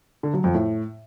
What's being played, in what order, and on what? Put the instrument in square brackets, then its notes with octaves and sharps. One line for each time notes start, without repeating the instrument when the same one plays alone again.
[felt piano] D3
F#3
F2
A2